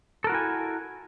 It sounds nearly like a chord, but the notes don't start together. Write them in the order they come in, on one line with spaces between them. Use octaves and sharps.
A4 A#4 F#4 E4 G#5